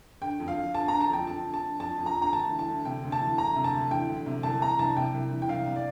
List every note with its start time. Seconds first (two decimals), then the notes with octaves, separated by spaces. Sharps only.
0.21 D3 G5
0.40 F2
0.48 F5
0.57 F2
0.74 D3 A5
0.88 D3 A#5
1.01 A5
1.09 F2 G5
1.27 F2 A5
1.45 D3
1.54 A5
1.62 D3
1.80 F2 A5
1.98 F2
2.06 A#5
2.15 D3
2.22 A#5
2.32 D2 A5
2.50 E3
2.59 A5
2.68 D2
2.85 C3 G5
3.04 D2
3.12 A5
3.21 E3
3.38 D2 A#5
3.56 C3
3.64 A5
3.74 D2
3.91 E3 G5
4.09 D2
4.26 C3
4.43 C2 A5
4.62 E3 A#5
4.79 C2 A5
4.97 C3 G5
5.14 C2
5.32 E3
5.42 G5
5.49 C2 F5
5.67 C3
5.76 D5